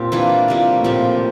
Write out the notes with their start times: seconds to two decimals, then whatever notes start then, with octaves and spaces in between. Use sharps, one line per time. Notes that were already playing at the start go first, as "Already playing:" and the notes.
Already playing: A#2 C4 G4
0.12 E3 A#3 D4 F4
0.48 C3 G3 A#3
0.78 A2
0.84 A#2 F3 C4 G4